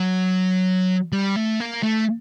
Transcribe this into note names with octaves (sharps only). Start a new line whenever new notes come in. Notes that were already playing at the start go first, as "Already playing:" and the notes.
Already playing: F#3
G3
A3
A#3
A3